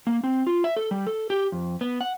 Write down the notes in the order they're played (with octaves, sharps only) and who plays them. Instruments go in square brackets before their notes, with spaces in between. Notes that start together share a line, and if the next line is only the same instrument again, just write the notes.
[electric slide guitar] A#3
C4
F4
E5
A4
G3
A4
G4
F2
B3
F#5